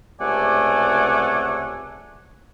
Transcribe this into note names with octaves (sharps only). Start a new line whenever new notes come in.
C#2 C3 A3 D5 F#5 G#5